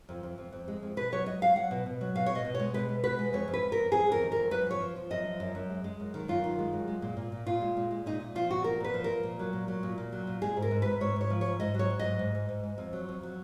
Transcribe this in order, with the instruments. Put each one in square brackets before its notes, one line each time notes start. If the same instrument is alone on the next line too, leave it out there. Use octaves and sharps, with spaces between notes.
[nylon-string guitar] F2
F2
F2
F2
G#3
F2
B2 B4
F#3 C#5
F#3 D#5
F#3 F5
F#3 F#5
B2
B2
F#3
B2 F5
B2 C#5
D#5
B2
G#3 C#5
B2 B4
G#3
B2 B4
G#3
F2 C#5
F2
B4
F2
A#4
F2
F2 G#4
F2 A#4
D#3
F2 A#4
F#2 B4
F3 C#5
F3
F3
F#2 D#5
F3
F#2
F#2
G#3
G#3
F#2
D#3
F#2 F4
D#3
G#3
F#2
G#3
A#2
A#2
A#2
A#2 F4
G#3
A#2
G#3
A#2 D#4
A#2
F3 F4
A#2 F#4
F3 A#4
A#2 B4
F3
A#4
F3
A#2
F#3
A#2
F#3
A#2
A#2
F#3
A#2
G#3 G#4
G#2
A#4
G#2
G#2 B4
G#2 C#5
G#2 C#5
F3
G#2 C#5
G#2 D#5
F#3 C#5
F#3
G#2 D#5
G#2
G#2
G#2
G#2
F2
F#3
F2
F#3